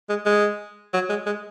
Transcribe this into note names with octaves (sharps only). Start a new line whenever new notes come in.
G#3
G#3
F#3
G#3
G#3